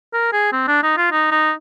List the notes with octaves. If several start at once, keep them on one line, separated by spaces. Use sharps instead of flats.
A#4
G#4
C4
D4
D#4
F4
D#4
D#4